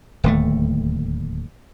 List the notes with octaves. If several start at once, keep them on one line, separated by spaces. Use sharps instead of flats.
D1 D#2 A3